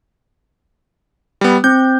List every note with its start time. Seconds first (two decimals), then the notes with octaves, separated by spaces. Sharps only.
1.41 G3 B3
1.64 C4 G6